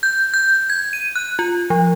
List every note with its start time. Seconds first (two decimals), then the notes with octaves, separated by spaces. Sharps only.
0.03 G6
0.34 G6
0.70 G#6
0.93 D#7
1.16 F#6
1.39 F4
1.70 F3